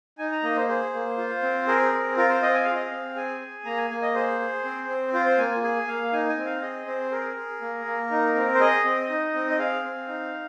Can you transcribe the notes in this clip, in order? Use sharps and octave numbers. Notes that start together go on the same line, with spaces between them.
D#4 G#5
A#5
A#3 D#5
C5
G#4 C5
A#3
F4
C4
G#4 A#4
C4
F4 A#4
C5
C4 D#5
G#5
G#4 F5
D#5
F5
C4
G#4 G#5
G#4
A#3 A#5
G#5
A#3 G#5
D#5
G#4 C5
G#4
C4
C4
F4 C5
C5
A#3 G#5
G#5
G#4 G#5
A#3 F5
D#4 G#5
G#5
C4
F5
G#4 D#5
C4 C5
G#4 A#4
G#4
A#3
A#3
D#4
C4
C5
G#4 D#5
C4
D#4
C4
D#5
G#4 F5
C4
D#4